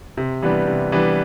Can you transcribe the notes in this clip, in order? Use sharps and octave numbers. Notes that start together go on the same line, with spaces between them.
C3
E3 G3 B3 D4
C3
E3 G3 B3 D4